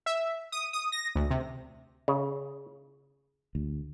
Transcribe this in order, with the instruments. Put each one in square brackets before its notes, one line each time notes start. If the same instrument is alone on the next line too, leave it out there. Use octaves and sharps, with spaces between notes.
[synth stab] E5
D#6
D#6
A#6
D2
C3
[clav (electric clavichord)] C#3
[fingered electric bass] D2